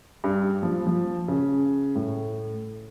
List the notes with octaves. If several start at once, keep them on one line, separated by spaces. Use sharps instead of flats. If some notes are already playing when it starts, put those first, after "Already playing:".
G2
F3
F3
C#3
A2